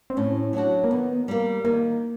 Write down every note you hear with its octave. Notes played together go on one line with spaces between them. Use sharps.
C4
A2 C#4
F#3 A3 D4 F#4
A#3
D#3 B3
G3 A#3
D#3 A#3